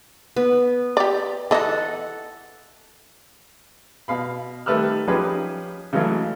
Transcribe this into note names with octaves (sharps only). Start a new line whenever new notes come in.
B3
G4 D5
E3 A4 D#5 F#5
B2 F5 B5
D#3 G3 A3 B4 E6 F6
F3 C#4 D#4 G4 G#4 B4
C#3 E3 F#3 G#3 A3